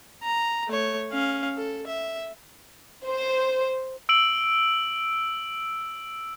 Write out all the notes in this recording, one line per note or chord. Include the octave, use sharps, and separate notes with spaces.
A#5
A3 C#5
C#4 F5
A4
E5
C5
E6 D7 F#7